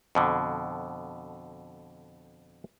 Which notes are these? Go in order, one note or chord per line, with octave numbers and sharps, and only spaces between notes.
F2 B2 D3